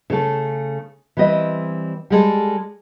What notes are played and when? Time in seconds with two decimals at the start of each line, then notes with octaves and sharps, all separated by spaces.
0.10 C#3 A3
1.17 E3 G3 C4 D#5
2.10 G3 G#3 A4